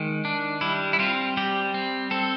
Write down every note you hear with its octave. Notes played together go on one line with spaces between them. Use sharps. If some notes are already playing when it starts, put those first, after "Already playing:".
Already playing: D#3 G#3
D4
G3 E4
E4
C4 F4
G3 G4
C4
C4 A4